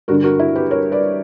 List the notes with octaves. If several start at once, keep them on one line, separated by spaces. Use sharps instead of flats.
G2 D3 F#4 A#4
F#4 A#4
E4
G4 B4
A#4 C#5
B4 D5